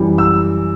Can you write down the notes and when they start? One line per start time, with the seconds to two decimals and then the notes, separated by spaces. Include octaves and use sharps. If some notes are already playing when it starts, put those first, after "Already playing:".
Already playing: F#2 E3 G3
0.18 E6